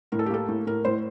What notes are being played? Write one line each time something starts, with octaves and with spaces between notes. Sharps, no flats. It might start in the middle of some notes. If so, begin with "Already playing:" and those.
A2 A#4
A4
G4
A#3 A4
A2
A2 A#4
A2 C5